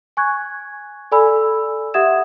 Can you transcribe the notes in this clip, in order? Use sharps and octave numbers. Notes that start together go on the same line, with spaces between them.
G#5 C#6 F#6 G#6
A4 D5 G#5 B5 E6
G4 E5 F#5 D#6 G#6 E7